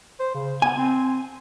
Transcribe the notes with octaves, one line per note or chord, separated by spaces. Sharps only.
C5
C#3
B3 G#5
C4